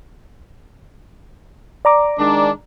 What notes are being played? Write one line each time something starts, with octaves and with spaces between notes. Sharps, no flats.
D5 A#5 D6
D#3 G#3 D4